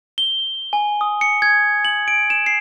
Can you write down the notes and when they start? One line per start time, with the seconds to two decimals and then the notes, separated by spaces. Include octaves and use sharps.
0.18 G7
0.73 G#5
1.01 D#6
1.21 C#7
1.42 G#6
1.85 F#7
2.08 D7
2.30 E7
2.46 C7